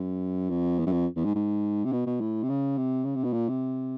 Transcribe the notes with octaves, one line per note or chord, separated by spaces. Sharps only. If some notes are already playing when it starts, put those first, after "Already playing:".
Already playing: F#2
F2
E2
F#2
F2
E2
G#2
G#2
C3
B2
B2
A2
C3
C#3
C3
C#3
C3
B2
A#2
C3